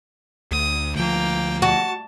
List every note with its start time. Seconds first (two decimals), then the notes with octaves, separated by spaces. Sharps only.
0.51 D2 D#6
0.96 D2 F3 A#3 G5
1.62 F#4 A5